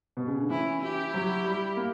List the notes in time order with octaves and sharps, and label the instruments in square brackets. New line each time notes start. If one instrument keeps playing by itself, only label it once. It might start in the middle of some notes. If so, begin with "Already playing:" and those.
[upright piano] B2
C#3
D3
[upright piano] E3 [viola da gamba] C#4 E4
[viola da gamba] E4 G4
[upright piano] F#3
G3
A#3